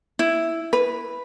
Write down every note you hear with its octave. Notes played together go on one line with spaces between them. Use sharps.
E4
B4